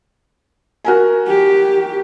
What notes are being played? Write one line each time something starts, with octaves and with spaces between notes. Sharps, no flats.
F#4 A#4 G#5
G4